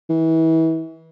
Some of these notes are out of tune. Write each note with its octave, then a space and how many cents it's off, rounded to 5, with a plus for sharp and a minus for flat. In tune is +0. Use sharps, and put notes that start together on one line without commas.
E3 -30